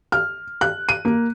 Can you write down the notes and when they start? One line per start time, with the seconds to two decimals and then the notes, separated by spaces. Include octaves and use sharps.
0.12 F6
0.61 F#6
0.89 D#7
1.05 A#3